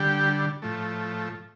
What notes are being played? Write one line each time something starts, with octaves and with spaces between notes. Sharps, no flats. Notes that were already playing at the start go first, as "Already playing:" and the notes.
Already playing: D3 G3 G4
A2 F3 A3